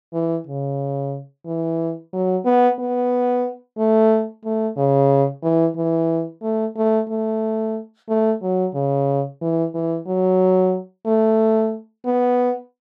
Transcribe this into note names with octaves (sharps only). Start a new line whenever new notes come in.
E3
C#3
E3
F#3
B3
B3
A3
A3
C#3
E3
E3
A3
A3
A3
A3
F#3
C#3
E3
E3
F#3
A3
B3